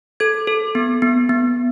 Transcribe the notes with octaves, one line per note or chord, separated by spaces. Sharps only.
A4 G#6
A4
B3
B3
B3